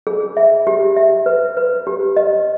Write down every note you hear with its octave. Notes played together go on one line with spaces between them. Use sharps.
G#4
E5
G4
E5
B4
B4
G4
D#5